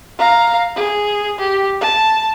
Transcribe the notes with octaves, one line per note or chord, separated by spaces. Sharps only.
F5 A#5
G#4
G4
A5